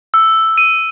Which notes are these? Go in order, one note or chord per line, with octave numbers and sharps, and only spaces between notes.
E6
D#7